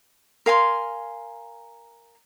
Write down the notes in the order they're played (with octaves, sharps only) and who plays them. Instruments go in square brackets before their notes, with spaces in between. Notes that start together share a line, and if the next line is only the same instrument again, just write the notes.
[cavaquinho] A#4 F5 G#5 C6